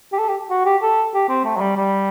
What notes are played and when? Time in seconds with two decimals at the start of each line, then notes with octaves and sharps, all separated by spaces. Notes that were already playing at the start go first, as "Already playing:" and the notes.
0.13 G4
0.19 A4
0.29 G4
0.50 F#4
0.66 G4
0.82 A4
1.14 G4
1.29 C4
1.45 A3
1.57 F#3
1.61 G3
1.77 G3